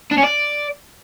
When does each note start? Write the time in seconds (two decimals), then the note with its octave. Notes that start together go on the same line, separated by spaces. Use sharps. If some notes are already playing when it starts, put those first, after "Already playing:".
0.12 D4
0.18 C#4
0.24 D5